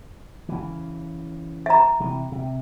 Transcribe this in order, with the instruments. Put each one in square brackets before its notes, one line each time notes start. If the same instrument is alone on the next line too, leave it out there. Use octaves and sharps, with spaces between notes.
[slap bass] C#3 E3
[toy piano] E5 A#5
[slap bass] C3 E3
C3